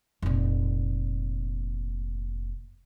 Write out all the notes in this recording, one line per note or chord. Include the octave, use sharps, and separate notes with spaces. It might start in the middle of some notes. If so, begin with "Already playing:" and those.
F1 A#2